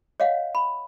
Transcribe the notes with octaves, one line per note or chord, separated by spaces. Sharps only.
C#5 D#5 F5 F#5
B5